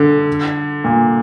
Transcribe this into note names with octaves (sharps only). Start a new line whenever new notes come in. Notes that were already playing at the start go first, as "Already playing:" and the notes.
Already playing: D3
A#2